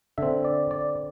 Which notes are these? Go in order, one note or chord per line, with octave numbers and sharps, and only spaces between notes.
D3 C4 E5
D5
D5